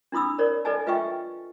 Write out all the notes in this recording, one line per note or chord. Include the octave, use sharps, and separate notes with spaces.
D4 E4 B5 D#6 E6
A#4 C#5 D5
A4 B4 D5 D#5 G#5 A5
F4 B4 D#5 E5 G5 C#6